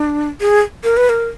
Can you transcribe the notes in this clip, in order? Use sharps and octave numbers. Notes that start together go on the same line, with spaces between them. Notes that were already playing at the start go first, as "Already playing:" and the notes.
Already playing: D4
G#4
A#4
B4
A#4